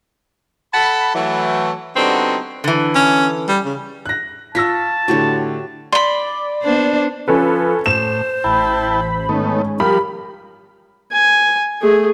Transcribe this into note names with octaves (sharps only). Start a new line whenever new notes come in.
A4 F#5 A5 B5
E3 F#3 A3
D3 G3 B3 C4 D#4 F#4
D3 E3
C#4
G3
C#3
F#6 A#6
F4 A5 C#6 E6 A#6 B6
A2 D3 F#4 G4 C#5
D5 B5 C6
B3 D4 C5
F3 C#4 A4 B4
A2 C5 E7
A1 E4 G5 A5 B5
G#2 D#3 A3 B3 C#4
F3 G3 G4 A#4 B5
G#5
A3 G#4